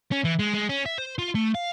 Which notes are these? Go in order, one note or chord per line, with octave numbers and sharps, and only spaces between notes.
C#4
E3
G#3
G#3
C#4
E5
C5
F4
A3
F5